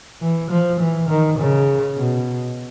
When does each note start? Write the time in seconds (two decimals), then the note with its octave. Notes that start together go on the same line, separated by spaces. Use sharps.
0.21 E3
0.50 F3
0.80 E3
1.09 D#3
1.39 C#3
1.97 B2